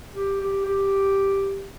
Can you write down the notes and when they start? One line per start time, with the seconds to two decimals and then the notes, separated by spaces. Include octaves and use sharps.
0.15 G4
0.40 G4
0.66 G4